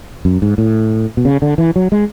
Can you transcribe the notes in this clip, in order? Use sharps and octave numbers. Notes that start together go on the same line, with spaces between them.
F#2
G#2
A2
B2
C#3
D3
E3
F#3
G#3